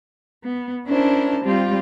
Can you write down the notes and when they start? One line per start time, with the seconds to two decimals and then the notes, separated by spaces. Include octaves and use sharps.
0.43 B3
0.86 C#4 D4 E4 A#4 C5 A5
1.44 G3 C4 F4 G4